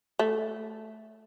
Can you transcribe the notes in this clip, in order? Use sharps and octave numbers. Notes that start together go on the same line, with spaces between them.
A3